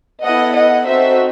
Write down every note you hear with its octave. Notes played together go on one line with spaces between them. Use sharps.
B3 E4 A4 D#5 F#5
D#5 F#5
C4 D#4 F#4 A4 C5 E5